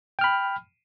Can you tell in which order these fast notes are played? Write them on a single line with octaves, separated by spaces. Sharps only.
G5 F6 B5